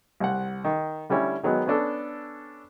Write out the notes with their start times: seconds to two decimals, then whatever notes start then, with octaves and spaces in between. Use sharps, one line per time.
0.20 C2 F#5
0.64 D#3
1.10 D3 G3 A3 C#4 E4
1.43 D#3 F#3 G#3 B3
1.66 B3 C#4 D4 A4